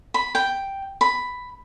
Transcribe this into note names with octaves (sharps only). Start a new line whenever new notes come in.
B5
G5
B5